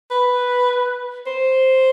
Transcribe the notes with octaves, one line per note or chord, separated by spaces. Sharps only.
B4
C5